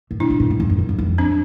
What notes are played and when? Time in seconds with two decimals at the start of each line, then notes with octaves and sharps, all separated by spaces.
0.11 A2
0.20 B2 D4 E4
0.30 B2
0.40 A#2
0.50 A2
0.60 F2
0.69 F#2
0.79 F2
0.89 F#2
0.98 F2
1.18 C4 D4